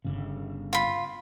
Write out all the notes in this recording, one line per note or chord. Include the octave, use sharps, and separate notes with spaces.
G1 C#3
F4 B5